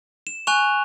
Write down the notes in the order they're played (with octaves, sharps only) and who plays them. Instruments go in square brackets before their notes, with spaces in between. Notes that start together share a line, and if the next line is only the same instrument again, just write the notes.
[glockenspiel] E7
G#5 C#6 F#6 F7